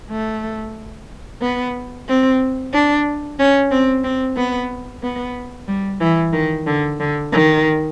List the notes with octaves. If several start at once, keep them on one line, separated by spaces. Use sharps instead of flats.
A3
B3
C4
D4
C#4
C4
C4
B3
B3
G3
E3
D#3
D3
D3
D#3